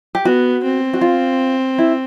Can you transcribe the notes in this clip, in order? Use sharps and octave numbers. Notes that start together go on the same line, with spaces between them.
G4
B3 F#4
C4
F#4
F4
E4